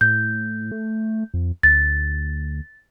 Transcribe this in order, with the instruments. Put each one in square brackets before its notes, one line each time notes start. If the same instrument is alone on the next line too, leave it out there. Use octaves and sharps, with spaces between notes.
[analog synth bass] A2 [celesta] G6
[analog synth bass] A3
F2
[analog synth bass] D2 [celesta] A6